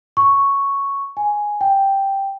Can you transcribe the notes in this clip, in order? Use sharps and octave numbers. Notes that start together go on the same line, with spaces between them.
C#6
G#5
G5